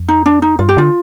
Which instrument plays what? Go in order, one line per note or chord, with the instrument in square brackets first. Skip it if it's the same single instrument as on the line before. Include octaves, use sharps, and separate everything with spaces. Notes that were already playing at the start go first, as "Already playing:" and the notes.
Already playing: [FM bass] F2
[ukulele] D#4
D4
D#4
[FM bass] G2 [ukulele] F4
[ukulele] G4
[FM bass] D3 [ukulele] F4